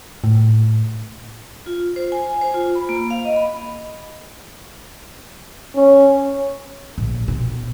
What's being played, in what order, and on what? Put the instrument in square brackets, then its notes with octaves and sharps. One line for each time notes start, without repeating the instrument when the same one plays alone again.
[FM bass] A2
[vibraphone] F4
C5
G#5
C5
F4
B5
A#3
F5
D#5
B5
[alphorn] C#4
[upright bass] A#1
B2